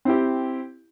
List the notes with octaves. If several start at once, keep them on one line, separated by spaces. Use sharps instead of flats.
C4 E4 G4